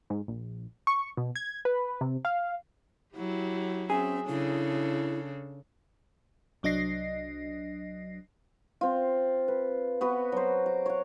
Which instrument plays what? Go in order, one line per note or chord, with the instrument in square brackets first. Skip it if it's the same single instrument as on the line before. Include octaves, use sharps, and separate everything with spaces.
[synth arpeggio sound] G#2
A#1
C#6
B2
G#6
B4
C3
F5
[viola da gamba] F#3 [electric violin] E4 G4
[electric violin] C4 E5 [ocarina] C#4 [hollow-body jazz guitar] G#4
[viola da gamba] C#3 [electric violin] D4 A4 [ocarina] E4
[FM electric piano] C2 F#3 D4 D#5 A#6 C7
[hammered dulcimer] C4 F4
B4
B3 F#4 B4
F#3 C5
D6
C#5 F#5